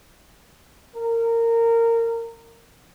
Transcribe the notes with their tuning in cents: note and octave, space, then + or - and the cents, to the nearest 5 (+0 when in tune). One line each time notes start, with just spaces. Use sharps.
A#4 -20